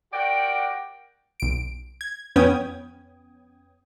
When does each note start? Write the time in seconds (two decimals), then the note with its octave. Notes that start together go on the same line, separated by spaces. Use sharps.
0.13 F#4 G4 A#4 D5 F#5 G5
1.40 B1 D7
2.01 G#6
2.36 F2 B3 C#4 G5 D#6 G#6